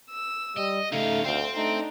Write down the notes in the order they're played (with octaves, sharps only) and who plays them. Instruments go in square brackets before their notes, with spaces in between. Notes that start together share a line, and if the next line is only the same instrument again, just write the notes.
[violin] E6
[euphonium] G3 [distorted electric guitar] D#5
[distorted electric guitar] C#3 D#4 [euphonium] A3 [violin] F5
[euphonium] D2 [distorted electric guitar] C5 G5
[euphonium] A3 [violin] D4 D#4